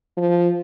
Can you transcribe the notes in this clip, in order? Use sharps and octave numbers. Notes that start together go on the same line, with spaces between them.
F3